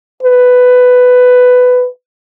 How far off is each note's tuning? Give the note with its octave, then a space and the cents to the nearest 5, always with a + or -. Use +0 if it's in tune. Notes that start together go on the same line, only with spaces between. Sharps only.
B4 +10